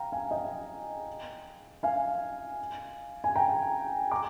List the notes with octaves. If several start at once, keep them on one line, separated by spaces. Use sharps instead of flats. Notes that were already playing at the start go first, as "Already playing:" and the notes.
Already playing: F5 G5 A#5
F5 G#5
D#5 G5
F5 G#5
G#5
G5 A#5
A#5 D6